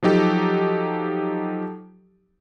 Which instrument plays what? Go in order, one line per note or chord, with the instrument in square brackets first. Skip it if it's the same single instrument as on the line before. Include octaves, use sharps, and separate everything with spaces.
[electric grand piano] F3 F#3 D#4 G4 A4